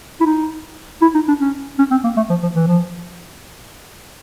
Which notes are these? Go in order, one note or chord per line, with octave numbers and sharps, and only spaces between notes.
E4
D#4
E4
D#4
D4
C#4
C#4
C4
A#3
A3
F3
F3
E3
F3